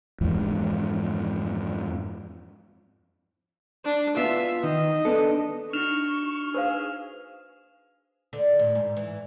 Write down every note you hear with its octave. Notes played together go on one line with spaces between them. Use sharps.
F2 G#2 E3
D4
B3 F4 E5
D#3 D#5
B3 D4 A4
D4 D#4 F#4 C#6 F6 E7 F7
G#4 B4 C5 F5
D3
A2
G#2
E3